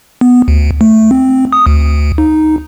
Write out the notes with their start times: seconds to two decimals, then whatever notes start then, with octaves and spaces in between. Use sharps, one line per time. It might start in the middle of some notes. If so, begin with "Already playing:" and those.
0.21 B3
0.48 D2
0.81 A3
1.11 C4
1.53 D#6
1.67 D2
2.18 D#4